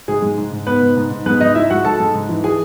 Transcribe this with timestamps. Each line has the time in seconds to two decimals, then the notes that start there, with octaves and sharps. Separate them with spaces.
0.08 G#2 G#4
0.22 G#3
0.38 G#2
0.52 G#2
0.67 G#2 B3 B4
0.82 G#2
0.96 G#2
1.11 G#2
1.26 G#3 B3 B4
1.40 G#2 D#4 D#5
1.55 G#2 E4 E5
1.70 G#3 F#4 F#5
1.84 G#2 A4 A5
2.00 G#3
2.14 G#2
2.29 E3
2.44 G#4 G#5